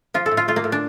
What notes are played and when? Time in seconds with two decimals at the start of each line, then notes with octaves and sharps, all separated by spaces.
0.14 F3 F4
0.26 A4
0.31 A2
0.37 F4
0.48 A3 F4
0.56 A#3
0.64 A2
0.72 D4